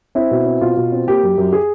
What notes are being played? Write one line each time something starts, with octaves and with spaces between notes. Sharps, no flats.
C4 E4
B2
C4
B2 F4
B2
C4
A#3 G4
F#2
F#2
G#4